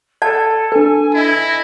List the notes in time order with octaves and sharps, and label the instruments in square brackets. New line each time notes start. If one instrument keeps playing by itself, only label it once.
[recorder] A4 [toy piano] D5 A5
[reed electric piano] D4 A4 [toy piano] B4 [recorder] G#5
[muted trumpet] E4 [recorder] D#5